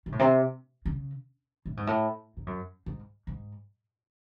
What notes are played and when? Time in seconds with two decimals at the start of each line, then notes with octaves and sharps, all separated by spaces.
0.06 C3
0.12 A2
0.19 C3
0.86 C#3
1.66 A2
1.77 G#2
1.87 A2
2.37 G#2
2.47 F#2
2.86 G#2
3.27 G#2